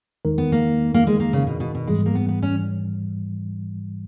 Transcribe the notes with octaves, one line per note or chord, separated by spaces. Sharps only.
E2 D#3 G#3 D#4 A#4
B3
A#3
A#3
G#3
A#3
C#3
B2
B2
B2
G#2 E3 G3 G#3
A#3
B3
B3
C#4